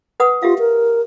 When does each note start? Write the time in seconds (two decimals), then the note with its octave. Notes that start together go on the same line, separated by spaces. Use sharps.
0.20 B4 F#5 D#6
0.43 F4 G4 E5 F5
0.59 A#4